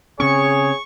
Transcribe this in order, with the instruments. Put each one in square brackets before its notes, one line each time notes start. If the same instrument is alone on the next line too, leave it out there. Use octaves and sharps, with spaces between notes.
[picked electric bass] C#3 C4 C#4 [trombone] G#4 [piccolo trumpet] C#5 [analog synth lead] C#6